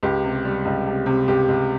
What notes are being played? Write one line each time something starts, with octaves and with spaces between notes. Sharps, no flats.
C#2 G4
C3
G3
C#2
C3
C3
C#2 G4
C#2